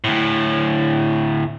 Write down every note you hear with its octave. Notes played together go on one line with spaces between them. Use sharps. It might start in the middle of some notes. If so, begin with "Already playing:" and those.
D2 A2